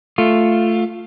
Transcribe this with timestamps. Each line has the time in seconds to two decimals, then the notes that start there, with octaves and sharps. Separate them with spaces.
0.18 A3 F4